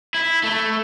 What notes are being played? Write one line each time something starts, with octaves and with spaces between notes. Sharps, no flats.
E4
A3